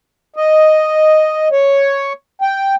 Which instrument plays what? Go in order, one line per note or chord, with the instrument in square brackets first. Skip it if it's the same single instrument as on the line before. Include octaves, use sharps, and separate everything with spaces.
[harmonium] D#5
C#5
G5